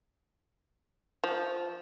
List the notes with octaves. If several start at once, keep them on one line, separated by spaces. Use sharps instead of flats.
F3